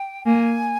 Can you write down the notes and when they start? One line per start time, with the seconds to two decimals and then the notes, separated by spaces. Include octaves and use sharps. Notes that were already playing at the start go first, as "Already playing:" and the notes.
Already playing: G5
0.26 A#3 G#5